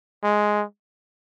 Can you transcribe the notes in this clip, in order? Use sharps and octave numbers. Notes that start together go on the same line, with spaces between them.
G#3